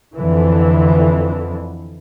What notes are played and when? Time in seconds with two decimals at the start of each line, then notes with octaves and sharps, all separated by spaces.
0.17 F2 D3 E3